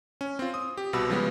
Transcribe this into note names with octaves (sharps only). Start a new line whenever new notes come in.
C#4
C4 F4
D#6
G4
C2 B2 F#4 B5 E6
C#3 F3 G3 G#3 B3